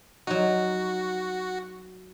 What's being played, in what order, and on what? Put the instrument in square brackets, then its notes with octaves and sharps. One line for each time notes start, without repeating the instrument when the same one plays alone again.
[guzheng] F#3 D#4 [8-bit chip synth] F#4